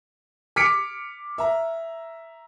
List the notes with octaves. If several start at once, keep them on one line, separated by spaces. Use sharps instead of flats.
D6 F6 B6 C#7 D7
E5 A#5